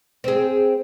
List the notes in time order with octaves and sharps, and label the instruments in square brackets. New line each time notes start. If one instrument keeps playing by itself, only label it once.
[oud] C4 G#4